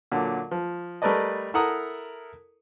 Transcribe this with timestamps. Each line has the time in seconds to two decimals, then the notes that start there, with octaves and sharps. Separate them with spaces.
0.12 A#2 D3 F#3
0.51 F3
1.02 G3 A3 A#4 B4 D5 D#5
1.54 E4 A4 A#4 F#5 A#5 D#6